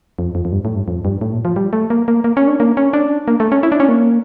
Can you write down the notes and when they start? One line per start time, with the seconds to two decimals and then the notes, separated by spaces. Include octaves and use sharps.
0.19 F2
0.35 F2
0.45 F2
0.52 G2
0.65 A2
0.75 G2
0.88 F2
1.05 G2
1.21 A2
1.32 A#2
1.45 F3
1.56 G3
1.73 A3
1.90 A#3
2.08 A#3
2.24 A#3
2.37 C#4
2.48 D4
2.60 A#3
2.77 C#4
2.93 D4
3.28 A#3
3.40 A3
3.52 C#4
3.63 E4
3.72 D4
3.80 C#4
3.89 A#3